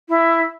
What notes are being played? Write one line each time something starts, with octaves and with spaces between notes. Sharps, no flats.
E4